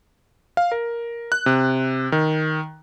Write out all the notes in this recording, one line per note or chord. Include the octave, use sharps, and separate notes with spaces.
F5
A#4
F#6
C3
D#3